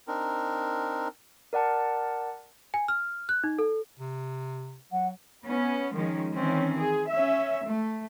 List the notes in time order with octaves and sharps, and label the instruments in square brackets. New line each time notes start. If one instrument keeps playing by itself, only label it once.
[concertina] C4 D4 D#4 A#4
[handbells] A#4 D5 F#5 A5
[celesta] G#5
F6
F#6
D#4
A4
[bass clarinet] C3
[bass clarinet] F#3 [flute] F#5
[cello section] B3 C#4
D#3 F3 G#3 C#4
D#3 E3 C4 C#4
G#4
C#4 E5
A3